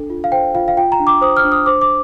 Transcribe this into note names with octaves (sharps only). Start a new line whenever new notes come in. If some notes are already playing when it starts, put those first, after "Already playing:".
Already playing: D4 A4
F4
F5
C5 G5
F4 F5
F5
F4 G5
A#5
D4
D6
C5 D#6
F6
D4
D#6
C5 D6
D6